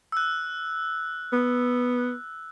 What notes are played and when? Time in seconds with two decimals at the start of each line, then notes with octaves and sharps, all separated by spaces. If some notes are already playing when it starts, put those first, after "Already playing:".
0.12 E6 F#6
1.33 B3